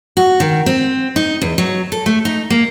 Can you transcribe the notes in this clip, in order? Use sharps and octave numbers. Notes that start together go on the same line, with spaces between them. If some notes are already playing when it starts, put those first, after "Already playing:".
F#4
D#3
C4
D#4
E2
F#3
A4
A3
D#4
A#3